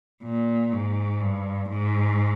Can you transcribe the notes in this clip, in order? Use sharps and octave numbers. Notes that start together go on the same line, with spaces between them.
A#2
G#2
G2
G#2